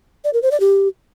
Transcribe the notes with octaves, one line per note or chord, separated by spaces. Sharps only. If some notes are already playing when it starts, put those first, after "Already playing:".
D5
A#4
C5
D5
G4